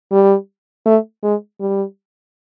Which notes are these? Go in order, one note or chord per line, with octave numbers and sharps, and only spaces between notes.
G3
A3
G#3
G3